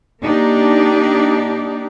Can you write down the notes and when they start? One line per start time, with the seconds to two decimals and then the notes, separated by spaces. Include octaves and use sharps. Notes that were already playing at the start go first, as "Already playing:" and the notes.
0.23 A#3 D4 D#4 G4